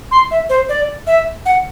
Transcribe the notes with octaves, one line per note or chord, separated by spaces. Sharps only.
C6
E5
C5
D5
E5
F#5